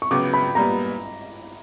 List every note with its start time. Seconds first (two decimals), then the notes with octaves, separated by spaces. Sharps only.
0.02 C#6
0.11 C#2 C#3 F#3 B3 D6
0.34 B5
0.55 A#2 G3 B3 A#5